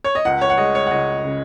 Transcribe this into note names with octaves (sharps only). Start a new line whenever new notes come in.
C#5
D#5
C#2 F#5
C#5
F#5
G#3 D#5
C#5
F#5
C#2 D#5
C#3